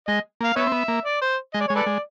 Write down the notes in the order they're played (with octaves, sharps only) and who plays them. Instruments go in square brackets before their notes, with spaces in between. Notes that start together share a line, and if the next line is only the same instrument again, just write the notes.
[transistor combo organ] G#3 [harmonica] D#5
[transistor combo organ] A#3 [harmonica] F5
[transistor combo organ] B3 [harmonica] B4 C#5 E5
[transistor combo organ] C4
B3
A#3
[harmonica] D5
C5
[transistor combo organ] G#3 [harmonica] D#5
[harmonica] D5
[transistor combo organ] G#3 [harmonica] C#5
[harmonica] A4 B4 D5
[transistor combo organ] G#3